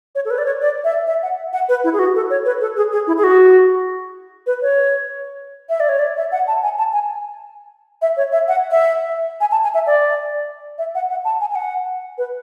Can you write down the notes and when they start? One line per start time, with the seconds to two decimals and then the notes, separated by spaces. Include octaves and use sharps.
0.15 C#5
0.25 A4
0.30 B4
0.38 D5
0.45 C#5
0.61 D5
0.84 E5
1.07 E5
1.23 F#5
1.53 F#5
1.69 B4
1.84 E4
1.93 G#4
1.99 F#4
2.15 A4
2.30 C#5
2.45 B4
2.61 A4
2.77 G#4
2.92 G#4
3.07 E4
3.17 G#4
3.24 F#4
4.47 B4
4.62 C#5
5.69 E5
5.80 D5
5.89 C#5
5.99 D5
6.17 E5
6.32 F#5
6.48 A5
6.63 G#5
6.78 A5
6.93 G#5
8.02 E5
8.17 C#5
8.32 E5
8.48 F#5
8.71 E5
9.41 G#5
9.52 A5
9.63 G#5
9.74 E5
9.87 D5
10.78 E5
10.95 F#5
11.10 F#5
11.25 A5
11.41 G#5
11.52 G#5
11.55 F#5
12.18 B4